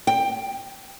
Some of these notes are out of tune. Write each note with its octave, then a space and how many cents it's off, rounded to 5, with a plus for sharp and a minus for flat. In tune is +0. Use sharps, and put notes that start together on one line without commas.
G5 +10